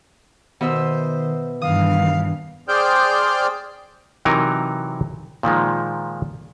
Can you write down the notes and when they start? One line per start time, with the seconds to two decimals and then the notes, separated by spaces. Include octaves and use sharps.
0.61 B2 D#3 C5 E5 E6
1.62 G2 D#3 E3 F5 D#6
2.69 G#4 C5 D5 G5 F6 G6
4.25 C3 E3 F#3 D#4 A#4
5.43 A#2 D#3 F3 G#3